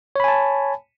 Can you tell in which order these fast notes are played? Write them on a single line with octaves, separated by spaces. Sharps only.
C#5 B5 G#5 A5